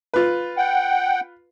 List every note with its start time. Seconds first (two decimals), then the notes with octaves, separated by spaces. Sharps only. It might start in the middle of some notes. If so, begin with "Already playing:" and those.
0.14 F4 B4
0.57 F#5 G5